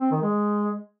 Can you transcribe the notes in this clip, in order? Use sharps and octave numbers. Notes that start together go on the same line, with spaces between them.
C4
D#3
G#3